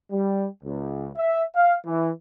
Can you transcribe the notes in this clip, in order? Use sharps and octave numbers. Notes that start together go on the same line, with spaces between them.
G3
C#2
E5
F5
E3